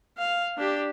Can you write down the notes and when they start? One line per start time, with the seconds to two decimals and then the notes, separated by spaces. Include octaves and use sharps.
0.18 F5
0.57 D4 G4